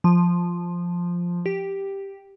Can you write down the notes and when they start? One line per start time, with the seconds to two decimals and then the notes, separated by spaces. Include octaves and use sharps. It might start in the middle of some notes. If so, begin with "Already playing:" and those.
0.04 F3
1.46 G4